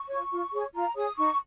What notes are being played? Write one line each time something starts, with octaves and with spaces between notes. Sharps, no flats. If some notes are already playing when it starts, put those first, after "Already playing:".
Already playing: C#6
F4 C#5
F4
G#4 C#5
F4 A#5
G#4 C#5 D#6
D#4 C#6